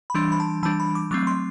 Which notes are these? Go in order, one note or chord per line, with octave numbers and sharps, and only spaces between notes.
B5
E3 G3 D4 C6
B5
A5
E3 G3 D4 A5
B5
D6
F#3 A3 C4 D6
C6